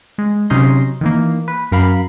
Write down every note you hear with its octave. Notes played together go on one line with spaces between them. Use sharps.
G#3
C3 F#3 C#4 D#4 C6 A#6
D#3 E3 A#3
B4
F#2 A#4 F5 B5